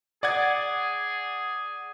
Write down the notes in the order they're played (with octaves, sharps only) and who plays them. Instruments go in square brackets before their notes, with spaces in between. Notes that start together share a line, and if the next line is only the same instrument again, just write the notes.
[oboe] G#4 [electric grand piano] D5 F#5 G#6